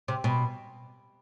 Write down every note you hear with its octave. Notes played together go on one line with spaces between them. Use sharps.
C3
B2